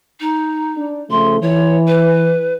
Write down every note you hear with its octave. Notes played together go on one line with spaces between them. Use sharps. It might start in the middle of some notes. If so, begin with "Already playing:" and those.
D#4
D4
C#3 F3 A3 C6
E3 C#5
B4